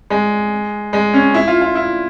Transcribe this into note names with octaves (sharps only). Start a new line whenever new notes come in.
G#3
G#3
C#4
E4
F4
F4
E4